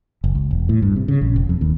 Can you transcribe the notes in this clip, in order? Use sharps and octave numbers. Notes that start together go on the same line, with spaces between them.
F#1
C#2
E1
A2
G2
C3
C#3
A#1
F1
F2
D#2